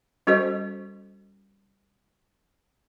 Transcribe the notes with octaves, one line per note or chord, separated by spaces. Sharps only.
G3 C#4 F#4 A4 C5 D#5